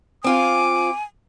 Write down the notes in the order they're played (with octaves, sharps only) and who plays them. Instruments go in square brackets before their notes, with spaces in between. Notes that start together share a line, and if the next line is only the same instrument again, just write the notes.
[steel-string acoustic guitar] C4 F4 F5 [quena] G#5 [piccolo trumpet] D6